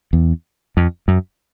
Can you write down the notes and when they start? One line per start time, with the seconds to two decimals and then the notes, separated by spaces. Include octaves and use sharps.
0.13 E2
0.77 F2
1.08 F#2